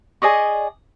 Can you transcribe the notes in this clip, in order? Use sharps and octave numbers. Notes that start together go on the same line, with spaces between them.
G#4 D5 D#5 C#6